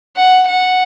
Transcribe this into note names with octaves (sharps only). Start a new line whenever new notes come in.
F#5
F#5